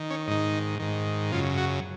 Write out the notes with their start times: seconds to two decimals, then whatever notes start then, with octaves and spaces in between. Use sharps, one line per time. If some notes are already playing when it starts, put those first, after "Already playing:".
Already playing: D#3
0.10 C#4
0.27 G#2 D#3 D#4
0.79 G#2 D#3
1.32 F#2 C#3 F4
1.57 F#4